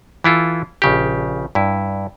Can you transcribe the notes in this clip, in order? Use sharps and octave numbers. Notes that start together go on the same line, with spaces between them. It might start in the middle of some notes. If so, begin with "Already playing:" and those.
E3 E4 F4 A4
A#1 C#3 G4
G2 E4